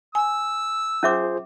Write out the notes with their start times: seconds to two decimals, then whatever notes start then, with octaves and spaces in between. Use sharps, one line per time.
0.15 G#5 E6
1.03 C#4 F4 G#4 C5 E5 D6